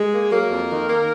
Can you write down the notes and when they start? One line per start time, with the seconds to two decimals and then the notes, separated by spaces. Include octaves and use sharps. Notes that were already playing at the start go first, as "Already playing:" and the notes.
Already playing: G#3 G#4
0.12 A#3
0.31 F#3 A#3 A#4
0.50 F2
0.69 D#3
0.88 A#3